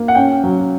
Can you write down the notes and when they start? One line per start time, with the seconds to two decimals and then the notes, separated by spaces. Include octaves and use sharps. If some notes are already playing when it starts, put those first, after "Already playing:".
Already playing: A#3
0.08 F#5
0.15 C#4 G5
0.44 F#3